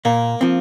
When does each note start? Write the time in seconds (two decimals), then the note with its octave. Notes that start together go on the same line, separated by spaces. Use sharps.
0.05 A#2 A#3
0.41 F3 C4